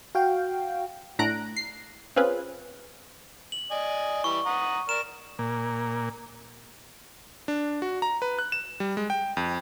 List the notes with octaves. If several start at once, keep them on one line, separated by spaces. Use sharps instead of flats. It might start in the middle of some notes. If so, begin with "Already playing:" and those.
F#4 F5 G5
A2 A3 D4 A#5 F#6 D7
C7
C4 C#4 F4 G#4 B4
F#7
D5 D#5 G#5
E3 G3 C#6
F#5 A#5 D#6
A#4 D5 F6 E7
A#2
D4
F#4
A#5
B4
F#6
E7
G3
G#3
G5
F2